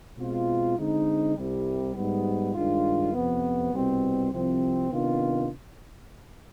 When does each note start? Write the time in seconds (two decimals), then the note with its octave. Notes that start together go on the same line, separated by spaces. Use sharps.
0.18 B2 G#3 C4 F4
0.77 D3 G#3 C4 D#4
1.36 C2 C3 G3
1.95 G#2 G3 B3
2.54 G2 D#3 G#3 D4 F4
3.13 F2 C3 F3 B3
3.72 C2 B2 G3 C4
4.31 C2 C3 F3 C4
4.90 C3 D#3 B3 D4 F4